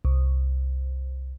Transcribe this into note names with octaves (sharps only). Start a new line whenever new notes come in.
C2